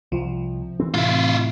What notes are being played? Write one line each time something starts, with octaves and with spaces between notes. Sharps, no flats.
C2 F3
E3 C4
A2 C3 E4 F4